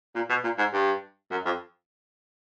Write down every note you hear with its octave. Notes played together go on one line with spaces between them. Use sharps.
A#2
B2
A#2
G#2
G2
F#2
F2